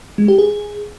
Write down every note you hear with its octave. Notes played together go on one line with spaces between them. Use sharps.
G#3
G4
G#4